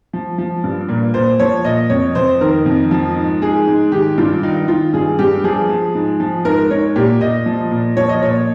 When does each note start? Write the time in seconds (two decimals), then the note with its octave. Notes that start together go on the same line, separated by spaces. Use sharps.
0.13 F3
0.38 F3
0.64 G2
0.89 A#2
1.14 A#2 C5
1.39 F3 C#5
1.65 A#2 D#5
1.90 F2 C#5
2.15 F2 C5
2.41 D#3 A#4
2.66 F2
2.91 F3
3.16 G#2
3.42 G#2 G#4
3.67 G#2
3.92 D#3 G4
4.18 G2 F4
4.43 D#3 D#4
4.68 D#3 F4
4.93 G2 G#4
5.19 G2 G4
5.44 F3 G#4
5.69 F3
5.95 G#2
6.20 F3
6.45 G#2 A#4
6.70 G#2 C#5
6.96 A#2 G4
7.21 A#2 D#5
7.46 F3
7.71 A#2
7.96 F3 C#5
8.09 D#5
8.22 A#2 C#5